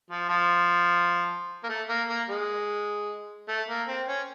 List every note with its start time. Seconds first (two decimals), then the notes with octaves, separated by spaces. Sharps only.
0.10 F3
0.29 F3
1.64 A#3
1.69 A3
1.89 A#3
2.09 A#3
2.29 G#3
3.49 A3
3.69 A#3
3.88 C4
4.08 C#4